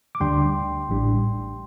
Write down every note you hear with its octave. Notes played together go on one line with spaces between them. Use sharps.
D6
D2 D3 G3 D4 G5 C6
A1 A2 G3 D4